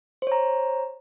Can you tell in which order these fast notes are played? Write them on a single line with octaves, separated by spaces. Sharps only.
C5 C#5 A#5